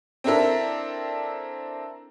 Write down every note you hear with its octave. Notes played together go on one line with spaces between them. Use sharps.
C4 D4 E4 A4 A#4